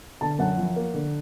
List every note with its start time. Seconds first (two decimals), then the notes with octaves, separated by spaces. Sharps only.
0.21 D3 A5
0.39 F#2 F#5
0.57 F3
0.76 A#3
0.94 D3